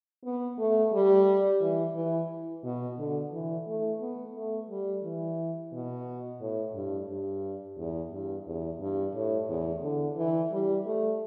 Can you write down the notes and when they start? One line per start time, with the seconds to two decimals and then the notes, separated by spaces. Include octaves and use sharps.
0.25 B3
0.58 A3
0.93 G3
1.61 E3
1.95 E3
2.64 B2
2.98 D3
3.32 E3
3.67 A3
4.01 B3
4.35 A3
4.70 G3
5.03 E3
5.73 B2
6.40 A2
6.75 G2
7.09 G2
7.77 E2
8.11 G2
8.46 E2
8.81 G2
9.15 A2
9.48 E2
9.83 D3
10.17 E3
10.52 G3
10.86 A3